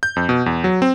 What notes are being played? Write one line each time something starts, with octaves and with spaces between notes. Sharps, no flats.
G6
F2
B2
E2
F#3
C4